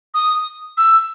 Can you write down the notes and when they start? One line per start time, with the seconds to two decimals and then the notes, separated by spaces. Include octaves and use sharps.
0.14 D#6
0.77 E6